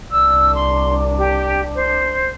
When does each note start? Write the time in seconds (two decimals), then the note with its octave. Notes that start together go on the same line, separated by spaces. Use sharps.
0.11 C2 D4 E6
0.55 C6
1.18 G4
1.75 C5